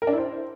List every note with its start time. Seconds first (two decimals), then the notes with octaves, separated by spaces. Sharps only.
0.02 A#4
0.07 D4
0.12 E4
0.18 C5